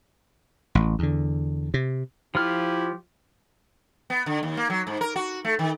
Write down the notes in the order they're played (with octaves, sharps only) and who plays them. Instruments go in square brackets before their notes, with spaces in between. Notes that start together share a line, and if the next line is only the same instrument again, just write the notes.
[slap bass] A1
E2 D3
C3
[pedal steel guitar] F3 F4 F6 [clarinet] E4 [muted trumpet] G4
[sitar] B3
D3
D#2
A#3
F#3
G#2
A#4
F#4
A3
D#3